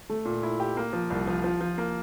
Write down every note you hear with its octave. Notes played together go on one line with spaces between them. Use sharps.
A3
A#2
E4
G4
A#3
F3
C2
F3
F3
F3
A#3